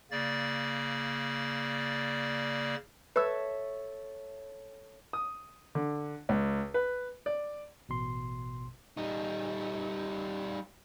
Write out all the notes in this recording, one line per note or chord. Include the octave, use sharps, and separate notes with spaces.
C#3 A#3 D5 A6
A4 B4 C#5 E5 E6
D#6
D3
C#2
B4
D5
A1 B2 C6
G3 D#4